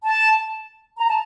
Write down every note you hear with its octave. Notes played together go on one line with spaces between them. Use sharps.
A5
A#5
A5